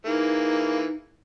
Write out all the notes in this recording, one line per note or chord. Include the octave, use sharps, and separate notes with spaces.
E3 A#3 D#4 G#4